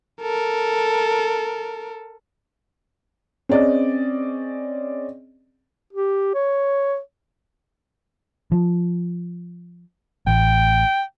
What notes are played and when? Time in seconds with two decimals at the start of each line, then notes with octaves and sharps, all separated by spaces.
0.22 A4 A#4
3.49 C4 C#4 G#4 D5 D#5
5.93 G4
6.34 C#5
8.52 F3
10.27 A1 G5